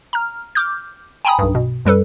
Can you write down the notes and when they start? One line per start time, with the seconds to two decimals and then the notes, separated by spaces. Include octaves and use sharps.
0.13 A#5 F6
0.55 D6 F6 G6
1.25 G5 G#5 A#5 B5 D#6
1.39 B1 G2
1.55 B2
1.85 F#2 G3 A4 B4